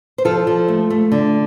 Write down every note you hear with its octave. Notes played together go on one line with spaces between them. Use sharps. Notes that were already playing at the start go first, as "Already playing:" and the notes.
C5
F3 F4 A4
F3
A3
A3
D3